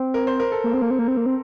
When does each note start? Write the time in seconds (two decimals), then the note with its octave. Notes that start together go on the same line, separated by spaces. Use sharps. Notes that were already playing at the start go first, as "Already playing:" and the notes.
Already playing: C4
0.14 A#4
0.27 C5
0.39 A#4
0.52 A4
0.64 A#3
0.74 C4
0.82 A#3
0.90 C4
0.99 A#3
1.08 C4
1.17 A#3
1.26 C4